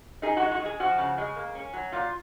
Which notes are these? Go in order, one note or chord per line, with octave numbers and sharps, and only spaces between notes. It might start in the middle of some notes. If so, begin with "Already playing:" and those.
D#4 G#4
F#4
G#3
F#4
G#3
G#4
F3 F#4
C#3
G#3
A#3
C#4
F#3
A#2 F4